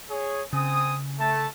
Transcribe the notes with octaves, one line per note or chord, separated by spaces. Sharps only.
G#4 C#5
C#3 C4 G#5 D#6
A3 A5